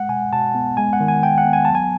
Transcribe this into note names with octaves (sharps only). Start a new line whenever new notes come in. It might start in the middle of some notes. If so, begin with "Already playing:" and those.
Already playing: G#3 F#5
B2 G#5
B2 A5
B3
G#3 G#5
F#5
D#3
G#5
D#3 G5
F#5
B3
G#5
F#3 A5
G#5